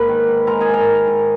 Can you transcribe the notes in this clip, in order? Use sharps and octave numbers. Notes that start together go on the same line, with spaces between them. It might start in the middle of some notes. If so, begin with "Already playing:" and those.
Already playing: G#2 A#3 B4 B5
D#3
G#2
G#3 A#4 A#5
G#4 G#5
G#2
A#4 A#5
D#3
G#2